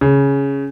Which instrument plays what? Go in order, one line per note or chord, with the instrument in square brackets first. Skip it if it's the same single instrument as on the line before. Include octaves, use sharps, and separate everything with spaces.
[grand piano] C#3